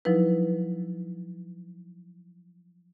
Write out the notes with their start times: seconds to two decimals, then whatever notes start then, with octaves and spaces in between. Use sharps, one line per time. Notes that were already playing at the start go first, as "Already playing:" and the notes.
0.05 F3 F#3 D#4 E4 B4